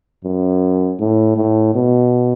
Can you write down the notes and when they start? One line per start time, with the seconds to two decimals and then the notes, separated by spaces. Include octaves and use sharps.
0.24 F#2
0.99 A2
1.36 A2
1.74 B2